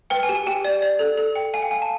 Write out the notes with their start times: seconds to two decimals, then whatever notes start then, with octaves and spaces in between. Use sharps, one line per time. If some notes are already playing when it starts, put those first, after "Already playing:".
0.10 B4 G5
0.23 G#5
0.29 G4
0.35 G#5
0.47 G4 G5
0.65 D5
0.82 D5
0.99 A4
1.17 A4
1.36 G5
1.54 F5 G#5
1.62 G5
1.71 F5 G#5
1.82 A5